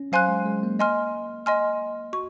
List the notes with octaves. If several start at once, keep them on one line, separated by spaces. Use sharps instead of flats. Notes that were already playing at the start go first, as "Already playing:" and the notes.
Already playing: C#4
F#3 C5 F5 G#5 C6 F#6
G#3
G#3
A#3
D#5 G#5 C6 F6
D#5 G#5 C6 F6
F#4 C#6